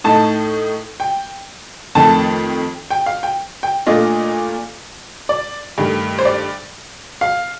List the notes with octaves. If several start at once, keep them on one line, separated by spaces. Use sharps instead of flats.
A2 A3 D#4 A5
G5
F2 D#3 A3 A5
G5
F5
G5
G5
A#2 A3 D4 F4 D#5
D5
G2 D#3 A3
C5
D5
F5